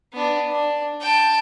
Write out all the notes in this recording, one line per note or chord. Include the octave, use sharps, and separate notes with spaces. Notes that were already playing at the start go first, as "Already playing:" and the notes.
B3 D4
D4
G5 A5